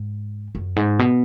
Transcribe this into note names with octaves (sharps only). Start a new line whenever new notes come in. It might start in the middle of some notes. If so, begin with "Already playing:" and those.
Already playing: G#2
F#2
G#2
B2